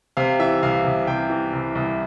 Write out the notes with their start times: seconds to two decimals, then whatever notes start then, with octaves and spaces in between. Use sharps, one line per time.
0.17 C3 F5
0.39 E3 E5
0.63 C2 F5
0.84 C2
1.07 C3 G5
1.30 E3
1.53 C2
1.75 C2